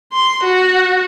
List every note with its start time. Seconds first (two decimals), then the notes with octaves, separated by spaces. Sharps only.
0.12 C6
0.43 F#4